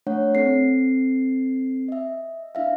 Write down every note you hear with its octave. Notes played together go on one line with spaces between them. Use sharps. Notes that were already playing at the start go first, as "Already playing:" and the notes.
A3 D4 C#5 F#5
C4 A4 C7
D#5 E5
D4 E4 E5 F5